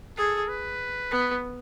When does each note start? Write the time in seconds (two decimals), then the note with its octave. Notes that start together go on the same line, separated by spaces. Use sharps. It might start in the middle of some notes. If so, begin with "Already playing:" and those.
0.18 G#4 A4
0.48 B4
1.11 B3